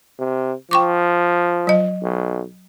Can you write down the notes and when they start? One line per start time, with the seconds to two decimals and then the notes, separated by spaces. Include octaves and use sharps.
0.19 C3
0.71 F3 G5 C#6 D6
1.67 F#3 D#5
2.02 B1